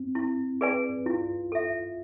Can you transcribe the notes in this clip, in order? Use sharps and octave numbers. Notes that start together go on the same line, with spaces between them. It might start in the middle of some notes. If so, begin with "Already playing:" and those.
Already playing: C4
E4
G#4 B4 D5 G#5
E4 F4
A4 E5